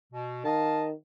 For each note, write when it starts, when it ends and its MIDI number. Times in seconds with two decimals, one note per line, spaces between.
0.13 0.43 47
0.45 0.93 51
0.45 0.83 75
0.45 0.83 77
0.45 0.83 81